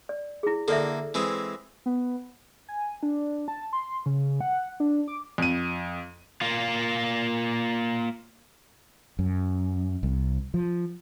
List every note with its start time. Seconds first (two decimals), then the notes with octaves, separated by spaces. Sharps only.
0.09 D5
0.43 E4 G#4
0.68 D3 A#3 A4 D5 E5
1.14 E3 G#3 C4
1.86 B3
2.68 G#5
3.03 D4
3.48 A5
3.73 C6
4.06 C#3
4.41 F#5
4.80 D4
5.08 D6
5.38 F2 D#7
6.41 A#3 F4
9.19 F#2
10.03 C2
10.54 F3